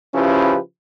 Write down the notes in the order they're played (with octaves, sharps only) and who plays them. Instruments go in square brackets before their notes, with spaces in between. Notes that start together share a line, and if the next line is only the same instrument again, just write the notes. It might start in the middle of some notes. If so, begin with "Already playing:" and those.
[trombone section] C#3 F3 C#4 E4 G4 B4